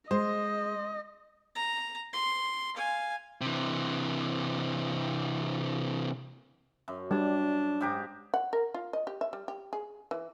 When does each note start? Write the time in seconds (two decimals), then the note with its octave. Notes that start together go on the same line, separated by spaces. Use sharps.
0.11 G#3 C5 D#5
1.55 A#5
2.13 C6
2.74 F5 G#5
3.41 C3 E3
6.88 F#2
7.11 G3 D4
7.81 G#2 G4 A#5
8.34 F#5
8.53 A#4
8.74 F4
8.93 D#5
9.07 G4
9.21 E5
9.33 G3
9.48 G4
9.73 G#4
10.11 E3